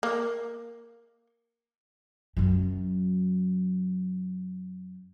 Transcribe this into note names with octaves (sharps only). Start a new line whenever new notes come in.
A#3
F#2 F#3